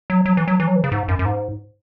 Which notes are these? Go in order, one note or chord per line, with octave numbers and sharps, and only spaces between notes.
F#3
F#3
E3
F#3
E3
F#3
E3
C#3
G#2
F#2
F#2
G#2